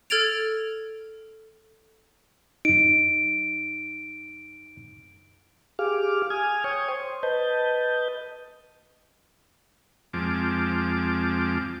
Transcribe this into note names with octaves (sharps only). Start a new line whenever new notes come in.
A4 F6 G#6 A6 D7 F7
F#2 D#4 D7
G4 G#4 F5 D6 F6
G#5 D#6 F6 G#6
C#5 G5 C#6 D#6
C5
B4 D#5 A5 G6
F2 F3 G#3 C4 A5 D6